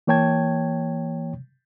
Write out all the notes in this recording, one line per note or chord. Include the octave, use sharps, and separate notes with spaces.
E3 A#3 C#5 G5 A5 G#6